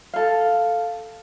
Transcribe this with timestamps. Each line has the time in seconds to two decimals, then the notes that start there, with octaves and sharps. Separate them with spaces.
0.14 A4 F5